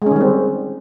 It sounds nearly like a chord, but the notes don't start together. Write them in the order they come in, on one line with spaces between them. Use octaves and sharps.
G#3 C#4 D#3 G3 C4